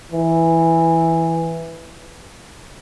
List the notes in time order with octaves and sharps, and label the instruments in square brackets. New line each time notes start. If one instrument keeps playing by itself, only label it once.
[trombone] E3